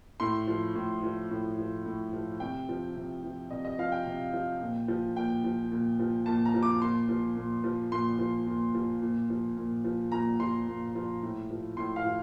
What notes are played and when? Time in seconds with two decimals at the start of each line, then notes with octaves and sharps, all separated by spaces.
0.20 A2 C6
0.48 F3
0.75 A2
1.03 F3
1.31 A2
1.58 F3
1.86 A2
2.13 F3
2.40 C3 G5
2.69 F3
2.96 C3
3.24 F3
3.51 C3 D#5
3.65 D#5
3.79 F3 F5
3.92 G5
4.06 C3
4.33 F3
4.61 A#2
4.88 F3
5.16 A#2 G5
5.44 F3
5.72 A#2
5.99 F3
6.26 A#2 A5
6.45 A#5
6.54 F3
6.63 D6
6.81 A#2 C6
7.09 F3
7.37 A#2
7.64 F3
7.92 A#2 C6
8.19 F3
8.47 A#2
8.75 F3
9.02 A#2
9.30 F3
9.57 A#2
9.84 F3
10.12 A#2 A#5
10.40 F3 C6
10.68 A#2
10.95 F3
11.23 A2
11.50 F3
11.77 A2 C6
11.96 F5
12.05 F3